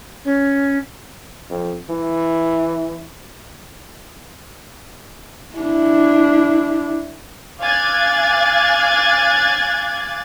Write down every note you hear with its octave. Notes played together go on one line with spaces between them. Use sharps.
C#4
F2
E3
D4 E4
F5 G#5 D6 F#6 G#6 A6